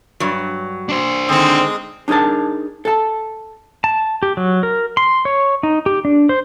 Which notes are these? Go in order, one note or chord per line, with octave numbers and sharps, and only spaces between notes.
G2 F#3
D4 C5
D3 D#3 G#3 C4 G#4 D#6
D4 D#4 G#4 A#4 A5
A4 A5
A5
G4
F#3
A#4
C6
C#5
D#4
G4
D4
C5